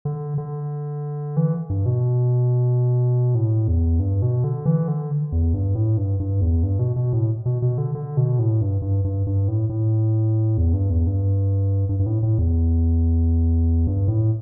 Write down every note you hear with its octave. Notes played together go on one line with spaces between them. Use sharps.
D3
D3
E3
G2
B2
A2
E2
G2
B2
D3
E3
D3
E2
G2
A2
G2
G2
E2
G2
B2
B2
A2
B2
B2
D3
D3
B2
A2
G2
G2
G2
G2
A2
A2
E2
G2
E2
G2
G2
G2
A2
A2
E2
G2
A2